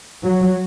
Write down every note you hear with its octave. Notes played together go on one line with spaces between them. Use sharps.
F#3